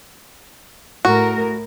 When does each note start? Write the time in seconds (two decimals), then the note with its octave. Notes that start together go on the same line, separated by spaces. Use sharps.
1.05 A2 F#4 A#4